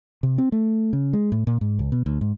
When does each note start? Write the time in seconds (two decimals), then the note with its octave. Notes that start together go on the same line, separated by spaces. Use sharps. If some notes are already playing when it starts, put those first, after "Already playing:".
0.23 C3
0.38 C4
0.52 A3
0.93 C#3
1.13 G#3
1.32 A2
1.47 A#2
1.61 G#2
1.79 C#2
1.92 B2
2.06 D2
2.21 G#2